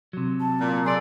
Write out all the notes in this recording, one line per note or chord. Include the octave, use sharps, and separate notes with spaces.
C3 F#3
A5
A#2
G#4 A4 D5 C6